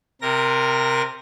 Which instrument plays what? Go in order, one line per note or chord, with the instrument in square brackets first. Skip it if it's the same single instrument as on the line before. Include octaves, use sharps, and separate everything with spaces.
[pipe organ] C3 A#4 A#6